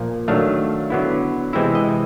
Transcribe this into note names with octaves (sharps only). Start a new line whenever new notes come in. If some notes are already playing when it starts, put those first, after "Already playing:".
Already playing: A#2 F3 A#3
D#3 F#3 A3 D4 F5
D3 F#3 B3 E4
C3 E3 G#3 C4 E4 E5
D#5